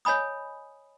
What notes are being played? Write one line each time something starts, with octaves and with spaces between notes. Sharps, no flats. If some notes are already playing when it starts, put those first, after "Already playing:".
C#5 D#5 G#5 B5 D#6